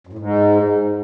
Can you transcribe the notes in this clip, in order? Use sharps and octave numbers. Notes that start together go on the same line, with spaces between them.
F#2
A2
G#2